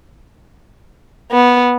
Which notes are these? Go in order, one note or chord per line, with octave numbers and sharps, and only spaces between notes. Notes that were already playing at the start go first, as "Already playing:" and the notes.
B3